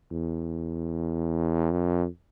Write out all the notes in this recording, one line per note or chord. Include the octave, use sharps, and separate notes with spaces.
E2
F2